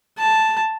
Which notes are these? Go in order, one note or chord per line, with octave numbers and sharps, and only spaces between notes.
A5